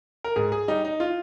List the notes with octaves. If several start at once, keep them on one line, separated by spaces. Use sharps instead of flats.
A#4
G#2 G#4
G#4
G3 D#4
D#4
F4